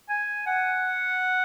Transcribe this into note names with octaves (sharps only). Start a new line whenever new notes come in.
G#5
F#5